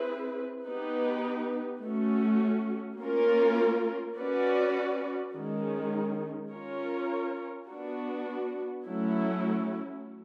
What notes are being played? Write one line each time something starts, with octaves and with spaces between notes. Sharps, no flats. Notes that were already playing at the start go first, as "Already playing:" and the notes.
Already playing: C4 E4 G#4 B4
B3 D#4 G4 B4
A3 C#4 F#4
A#3 C#4 F4 A#4
C#4 F#4 B4 D5
D#3 G#3 C#4
C#4 F4 A#4 C#5
B3 D4 F#4
F#3 A3 C#4 E4